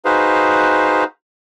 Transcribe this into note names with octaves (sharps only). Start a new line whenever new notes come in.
D#4 F#4 G#4 B4 C5 F5